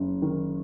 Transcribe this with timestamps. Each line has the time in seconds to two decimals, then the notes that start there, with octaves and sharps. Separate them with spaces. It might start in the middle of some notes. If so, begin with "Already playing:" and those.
Already playing: F#1
0.22 D#3